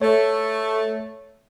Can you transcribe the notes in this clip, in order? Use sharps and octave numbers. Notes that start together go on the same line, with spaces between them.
A3 C#5